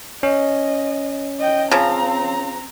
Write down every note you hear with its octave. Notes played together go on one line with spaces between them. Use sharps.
C#4 D#5
D#5 G5
C#3 F3 C4 A#5